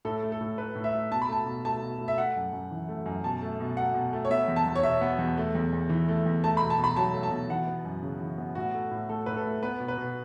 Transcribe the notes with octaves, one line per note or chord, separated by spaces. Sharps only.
A2 A4
A3
A4
A2
A3 B4
A2
E5
A3
B2 A5
B5
A3 A5
B2
A3 A5
B2
A3
E5
A3 F#5
F#2
F#2
E3
A3
F#2
B2 A5
A3
B2
A3 F#5
B2
A3
C#5
B3 E5
E2
A5
E2
C#5
B2 E5
B3
E2
A3
E2
E2
E3
A3
E2
A3 A5
B5
B2
A5
B2
B5
F#3 A5
A3
A5
B2
E3 F#5
B3
F#2
C#3
E3
B3
A2 F#4
A3
A2
A3 A4
A2 B4
A4
A3
B3 B4
B2
B4
B2